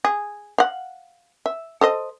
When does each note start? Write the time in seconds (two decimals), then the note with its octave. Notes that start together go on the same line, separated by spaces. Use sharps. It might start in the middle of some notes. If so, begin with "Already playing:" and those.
0.05 G#4
0.58 F5 F#5
1.46 E5
1.81 A4 C5 D#5